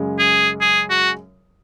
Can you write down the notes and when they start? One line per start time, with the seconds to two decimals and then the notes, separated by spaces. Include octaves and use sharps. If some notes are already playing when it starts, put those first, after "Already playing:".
Already playing: F#2 C#3 G#3
0.19 G#4
0.61 G#4
0.90 F#4